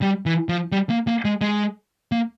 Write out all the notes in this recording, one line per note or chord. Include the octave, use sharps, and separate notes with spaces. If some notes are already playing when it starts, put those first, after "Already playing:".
G3
E3
F3
G3
A#3
A#3
G#3
G#3
A#3